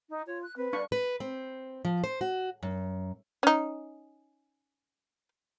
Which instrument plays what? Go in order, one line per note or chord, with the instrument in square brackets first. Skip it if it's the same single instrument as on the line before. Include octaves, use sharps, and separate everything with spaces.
[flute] D#4
[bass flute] F4 [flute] C#5
[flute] F#6
[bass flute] C4 [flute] B4
[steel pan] D4 F5 C#6 [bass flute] D5
[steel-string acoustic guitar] B4
C4
F3
C5
F#4
F#2
[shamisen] C#4 D#4